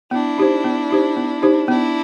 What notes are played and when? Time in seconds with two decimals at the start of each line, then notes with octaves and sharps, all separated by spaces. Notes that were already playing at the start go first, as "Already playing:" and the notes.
0.11 B3 D4 E4
0.38 D#4 G4 C5
0.64 B3
0.91 D#4 G4 C5
1.17 B3
1.42 D#4 G4 C5
1.68 B3 D4 E4